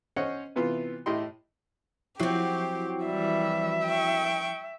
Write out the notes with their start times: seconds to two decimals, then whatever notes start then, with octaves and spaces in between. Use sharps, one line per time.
0.16 C#4 C5 C#5 D#5 F#5
0.56 C3 E3 B3 F4
1.06 A2 E4 G4 D#5 G5 C6
2.20 F3 F#3 C4 E4 G4 C7
3.06 E3 G3 E5
3.88 G5 C#6